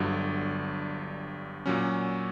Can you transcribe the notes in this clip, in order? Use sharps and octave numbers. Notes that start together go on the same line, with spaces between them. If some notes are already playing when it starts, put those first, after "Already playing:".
Already playing: G1 G2 D3 F#3
A#2 F#3 C#4